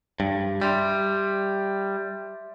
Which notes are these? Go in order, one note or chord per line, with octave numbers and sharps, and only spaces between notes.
G2
G3 E5 C6